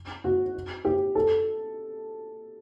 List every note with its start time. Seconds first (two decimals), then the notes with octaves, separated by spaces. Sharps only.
0.24 F#4
0.85 G4
1.15 A4